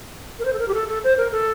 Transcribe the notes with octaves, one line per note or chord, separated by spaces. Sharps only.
A#4
C5
A4
A#4
G4
A4
A4
C5
A#4
A4